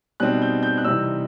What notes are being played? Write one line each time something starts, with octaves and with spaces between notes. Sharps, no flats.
B2 G3 C4 D#4 F#6
G6
G6
F#6
C3 E3 G3 C4 D#4 E6